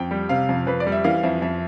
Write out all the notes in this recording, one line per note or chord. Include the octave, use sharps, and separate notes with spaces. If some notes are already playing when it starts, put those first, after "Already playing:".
Already playing: F2 G5
G3
C3 F5
F2
F2 B4
D5
G3
E5
E3 F5
F2 E5
F2 E5